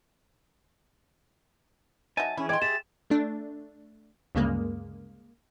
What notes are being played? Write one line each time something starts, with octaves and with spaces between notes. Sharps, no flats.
F#3 D#4 E5 G#5 A5
E3 C#4 E4 G#4
D5 D#5 G5 C6 G#6
G4 G#4 E5 A6 E7
A3 D4
D2 G2 C#3 G#3 A#3